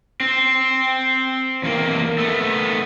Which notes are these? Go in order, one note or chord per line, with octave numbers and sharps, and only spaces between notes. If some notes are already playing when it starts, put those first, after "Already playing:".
C4
E2 A#3
A3 B3